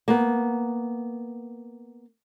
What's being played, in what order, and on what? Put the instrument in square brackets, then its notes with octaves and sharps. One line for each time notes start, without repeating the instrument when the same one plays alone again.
[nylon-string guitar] A#3 B3